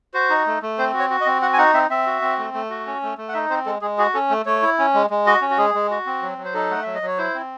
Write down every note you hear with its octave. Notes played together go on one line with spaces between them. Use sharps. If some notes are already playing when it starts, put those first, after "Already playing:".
F#4 C5
D#4
A3
A3
C4 C5
F#4
C#5
F#4
D#5
C4
F#4 F#5
G#5
D#4 F#5
C4 E5
C4 E5
F#4
C4
A3
A3
F#4
C#4
A3
A3
F#5
D#4 E5
C4 C5
G#3 A4
G#3 G#4
F#4 G#4
C#4 A4
A3
A3 C#5
E4
C#4
G#3
G#3
F#4 D#5
C#4
F#4
G#3 G#4
G#3
F#4
C4
F#3
F#3
C5
D#4 A4
A3 F#5
F#3 E5
D#5
F#3 C#5
E4 C5
C4